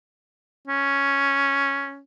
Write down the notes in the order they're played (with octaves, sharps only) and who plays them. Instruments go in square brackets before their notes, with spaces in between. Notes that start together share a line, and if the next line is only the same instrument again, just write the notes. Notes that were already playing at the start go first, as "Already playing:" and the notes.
[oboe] C#4